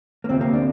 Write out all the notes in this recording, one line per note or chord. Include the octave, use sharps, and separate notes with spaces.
A#3
D2 C3 F3 C4
A#3
D4